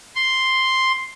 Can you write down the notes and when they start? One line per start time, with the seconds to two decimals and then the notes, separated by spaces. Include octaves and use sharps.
0.15 C6